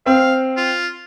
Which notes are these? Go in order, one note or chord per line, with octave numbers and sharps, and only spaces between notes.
C4 F5
F4